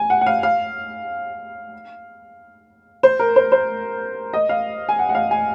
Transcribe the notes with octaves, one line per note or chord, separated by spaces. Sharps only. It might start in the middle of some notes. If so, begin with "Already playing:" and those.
Already playing: G#5
F#5
F#5
F5
F5
C5
A#4
C5
C5
D#5
F5
G#5
F#5
F#5
F5
G#5